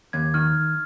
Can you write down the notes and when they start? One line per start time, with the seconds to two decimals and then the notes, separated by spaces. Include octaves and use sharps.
0.13 D#2 G#6
0.34 D#3 F6